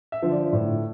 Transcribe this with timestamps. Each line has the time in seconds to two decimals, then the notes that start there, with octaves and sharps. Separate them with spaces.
0.12 E5
0.22 D3 F3
0.32 D5
0.53 A2